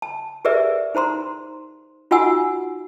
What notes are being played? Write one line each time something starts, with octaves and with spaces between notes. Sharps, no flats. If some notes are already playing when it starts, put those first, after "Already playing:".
A5
G4 G#4 A#4 B4 D5 E5
D#4 C5 A#5 C6
D#4 F4 F#4 F#5 G#5 E6